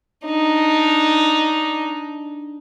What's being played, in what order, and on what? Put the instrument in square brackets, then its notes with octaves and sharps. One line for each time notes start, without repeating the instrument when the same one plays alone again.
[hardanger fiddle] D4 D#4